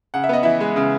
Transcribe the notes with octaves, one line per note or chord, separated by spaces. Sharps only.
C#3 F#5
E5
B3 D#5
E3 E4 E5
G#3
C#3